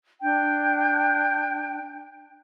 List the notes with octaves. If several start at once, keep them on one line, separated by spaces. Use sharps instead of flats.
D4 G5